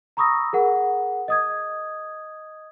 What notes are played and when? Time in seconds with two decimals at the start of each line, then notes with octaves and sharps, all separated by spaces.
0.17 A#5 B5 C#6 D#6 E6 A#6
0.53 G#4 A#4 F#5
1.28 D#5 D#6 G#6